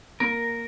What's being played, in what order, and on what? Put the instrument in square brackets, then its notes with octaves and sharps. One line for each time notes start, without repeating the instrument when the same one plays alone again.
[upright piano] A#3 [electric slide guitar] A#4